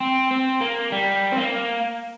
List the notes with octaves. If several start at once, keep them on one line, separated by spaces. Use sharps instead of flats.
C4
C4
A#3
G3
C4
A#3